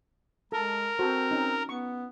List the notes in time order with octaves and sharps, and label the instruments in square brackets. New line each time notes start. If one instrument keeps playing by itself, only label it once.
[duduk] G#3 [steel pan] A4 [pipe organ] A#4
[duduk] C4 [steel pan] F#4 A4 C5
[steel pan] C#4 D#4
[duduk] B3 [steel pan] C#6